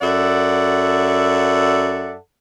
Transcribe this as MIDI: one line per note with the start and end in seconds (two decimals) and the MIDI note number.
0.02 2.15 42
0.02 2.15 69
0.02 2.15 74
0.02 2.15 76
0.02 2.15 78